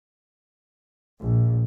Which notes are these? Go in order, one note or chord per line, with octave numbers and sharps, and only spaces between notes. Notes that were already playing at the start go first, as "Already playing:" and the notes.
A#1